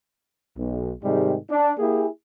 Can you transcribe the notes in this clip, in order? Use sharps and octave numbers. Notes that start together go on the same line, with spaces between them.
B1
G#2 C3 D#3 G3 G#3
D4
A#3 E4 G4 G#4